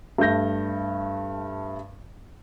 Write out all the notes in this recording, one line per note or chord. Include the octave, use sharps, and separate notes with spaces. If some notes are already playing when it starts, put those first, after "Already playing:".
G2 A3 G6 A#6